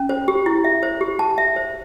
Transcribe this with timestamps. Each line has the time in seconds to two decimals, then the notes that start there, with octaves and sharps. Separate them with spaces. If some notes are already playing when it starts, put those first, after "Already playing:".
Already playing: C#4
0.09 C5
0.28 G4
0.46 E4
0.64 E5
0.83 C5
1.01 G4
1.19 A5
1.38 E5
1.56 C5